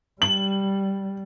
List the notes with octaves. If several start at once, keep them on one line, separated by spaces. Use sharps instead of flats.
G3 F#7